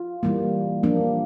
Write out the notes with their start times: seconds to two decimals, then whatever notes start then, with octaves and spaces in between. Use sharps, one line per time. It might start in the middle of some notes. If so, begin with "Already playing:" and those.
Already playing: F4
0.23 E3 G3 A#3
0.83 F3 A#3 D4